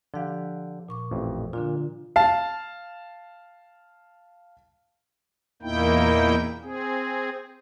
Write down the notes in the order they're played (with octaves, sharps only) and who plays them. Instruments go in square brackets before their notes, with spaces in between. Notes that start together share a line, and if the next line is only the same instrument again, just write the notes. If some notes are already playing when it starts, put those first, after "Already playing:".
[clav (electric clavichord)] D3 G4 [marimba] F3 F5
[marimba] A#2 C#6 D6
[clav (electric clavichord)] A1 F2
[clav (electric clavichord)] A#2 [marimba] D3 D4 F4
[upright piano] F5 A5
[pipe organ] E2 A#2 A#3 D#4 E4 G5
C4 G#4